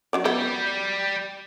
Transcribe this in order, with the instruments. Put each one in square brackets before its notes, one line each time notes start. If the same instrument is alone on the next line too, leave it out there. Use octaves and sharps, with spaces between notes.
[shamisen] F#3 C#4 D5
[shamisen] F#3 B3 E4 [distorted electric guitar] G3 G5